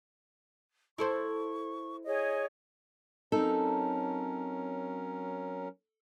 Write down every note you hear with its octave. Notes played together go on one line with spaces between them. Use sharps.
E4 A4 C5 C#6
G#4 C#5 D#5
F#3 C4 C#4 D#4 A4 A#4